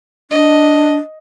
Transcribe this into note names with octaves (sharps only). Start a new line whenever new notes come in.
D4 D#5